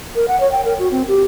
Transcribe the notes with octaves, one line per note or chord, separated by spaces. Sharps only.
A#4
F#5
C#5
G5
A#4
F#4
C4
G4